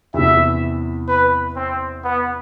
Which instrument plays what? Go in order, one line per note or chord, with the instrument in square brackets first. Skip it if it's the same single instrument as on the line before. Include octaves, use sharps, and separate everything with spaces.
[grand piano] E2 C3 E3 [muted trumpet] E5
[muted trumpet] B4
C4
B3